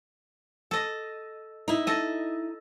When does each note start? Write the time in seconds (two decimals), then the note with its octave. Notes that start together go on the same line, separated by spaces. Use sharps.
0.71 A4 D#5
1.68 D#4 E4
1.87 A4 D#5